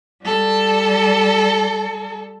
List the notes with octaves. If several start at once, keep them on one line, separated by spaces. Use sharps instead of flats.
G3 A4